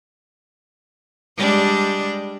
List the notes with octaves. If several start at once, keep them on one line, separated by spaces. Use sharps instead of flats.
G3 G#3 D4